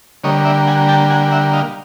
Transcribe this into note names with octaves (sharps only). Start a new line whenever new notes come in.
D3 G3 A#3 C#5 D#5
D5 E5
F#5 G#5
G5 A5
F#5 G#5
E5 F#5
D#5 F5